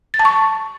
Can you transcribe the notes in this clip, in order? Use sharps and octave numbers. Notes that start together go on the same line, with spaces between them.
A6
A5
C#6